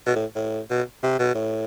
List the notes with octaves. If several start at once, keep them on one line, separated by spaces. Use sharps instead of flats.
B2
A2
A2
B2
C3
B2
A2